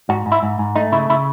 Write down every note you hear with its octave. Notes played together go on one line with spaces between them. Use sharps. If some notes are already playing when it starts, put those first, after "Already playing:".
G#2 F#4
G#2
E4
G#2
G#2
A3 D#4
C#3 E4
C#3 E4